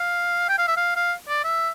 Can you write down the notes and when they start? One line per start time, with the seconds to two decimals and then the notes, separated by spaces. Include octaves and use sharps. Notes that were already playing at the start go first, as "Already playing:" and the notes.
Already playing: F5
0.49 G5
0.58 F5
0.68 E5
0.77 F5
0.96 F5
1.29 D5
1.45 E5